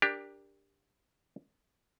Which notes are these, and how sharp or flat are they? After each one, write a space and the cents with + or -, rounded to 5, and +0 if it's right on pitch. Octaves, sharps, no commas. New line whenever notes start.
D4 +0 G4 +15 A#4 +0